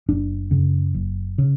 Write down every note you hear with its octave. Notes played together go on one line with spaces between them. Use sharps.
F#1 D4
F#2 C#3
F#1
C#3